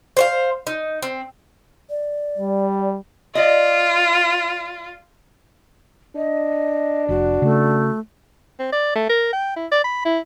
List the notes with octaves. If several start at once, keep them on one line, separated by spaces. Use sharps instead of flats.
C5 C#5 F5
D#4
C4
D5
G3
F4 D5 D#5
D4 D#5
F1 F#4
C#3 A3
C4
D5
A3
A#4
G5
E4
D5
B5
E4